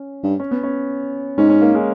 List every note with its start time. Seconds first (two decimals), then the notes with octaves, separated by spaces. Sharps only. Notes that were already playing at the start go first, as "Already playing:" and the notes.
Already playing: C#4
0.23 G2
0.40 C#4
0.51 B3
0.63 C#4
1.38 G#2 C#4
1.50 C#4
1.62 A#3
1.75 G#3